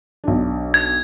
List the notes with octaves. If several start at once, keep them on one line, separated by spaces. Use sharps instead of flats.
B1 D4
G#6